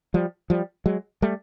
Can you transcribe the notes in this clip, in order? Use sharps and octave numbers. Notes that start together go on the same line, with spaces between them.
F3 G3
F3 G3
F#3 G#3
G3 A3